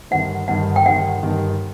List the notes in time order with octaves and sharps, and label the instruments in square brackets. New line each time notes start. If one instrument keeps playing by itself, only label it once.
[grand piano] G1 G2 D#3 [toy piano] F#5
[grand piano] G1 G2 D#3 [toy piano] F#5
[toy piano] G5
[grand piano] G1 G2 D#3 [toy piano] F#5
[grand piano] G1 G2 D#3